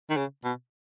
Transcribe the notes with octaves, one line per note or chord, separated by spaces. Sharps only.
D#3
C#3
B2